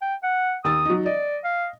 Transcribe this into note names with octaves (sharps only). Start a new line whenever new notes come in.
G5
F#5
D#2 D#6 E6 A6
F#3 D#4
D5 D#5
F5